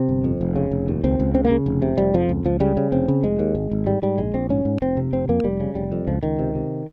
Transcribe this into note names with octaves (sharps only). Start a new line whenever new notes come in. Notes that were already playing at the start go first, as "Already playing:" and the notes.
Already playing: C3 C4
G1
F2
F1
C#3
F1
D#2
C#2 C4
C#2
C#3 C4
A#3
C#3
F1
C3
F1 G3
F2 F3
C#2
C#2 F3
C#3 G3
C#3
F1 C4
C#3
F1 G#3
D#2
G#1
G#1
G#2 G3
G#2 G3
A#1 G#3
A#1 C4
G#2 C#4
G#2
F1 C4
C3
F1 C4
F2 A#3
F1 G3
C#3
F1 G3
F2
C#2 F3
C#2 D#3
C3
C3